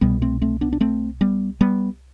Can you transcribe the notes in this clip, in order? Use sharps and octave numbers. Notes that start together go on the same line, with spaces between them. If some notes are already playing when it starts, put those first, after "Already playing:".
C2 B2 G3 B3
A3 C4
A3 C4
B3 D4
D4
A3 C4
G3 B3
G3 B3